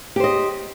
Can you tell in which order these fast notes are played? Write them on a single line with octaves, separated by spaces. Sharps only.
G4 C5 D#5